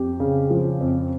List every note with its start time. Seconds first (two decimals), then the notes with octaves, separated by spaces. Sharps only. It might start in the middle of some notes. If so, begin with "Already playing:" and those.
Already playing: F2 G4
0.20 C#3
0.50 F3
0.81 F2